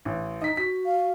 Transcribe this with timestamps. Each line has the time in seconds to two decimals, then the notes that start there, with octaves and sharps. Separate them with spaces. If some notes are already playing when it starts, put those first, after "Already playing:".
0.05 A1
0.41 D#4 D#5 B6
0.57 F#4 B6
0.85 F5